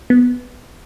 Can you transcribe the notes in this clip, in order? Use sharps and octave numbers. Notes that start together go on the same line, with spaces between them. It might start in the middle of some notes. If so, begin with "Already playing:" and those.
B3